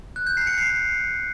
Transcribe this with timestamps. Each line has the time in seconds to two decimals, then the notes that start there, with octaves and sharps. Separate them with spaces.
0.16 F#6
0.27 G6
0.37 C7
0.47 C#7
0.58 C7